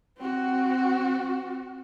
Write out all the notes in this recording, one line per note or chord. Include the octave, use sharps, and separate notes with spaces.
C4 F#4